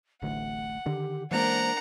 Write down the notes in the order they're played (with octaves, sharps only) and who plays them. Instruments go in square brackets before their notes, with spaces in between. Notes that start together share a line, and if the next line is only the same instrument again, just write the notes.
[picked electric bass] D1 A1 D2 [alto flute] A3 [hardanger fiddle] F#5
[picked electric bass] D3 D#3 [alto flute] G4
[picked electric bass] E3 G#3 A#3 [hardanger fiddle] D4 A#4 [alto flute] C5 [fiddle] F#5 A#5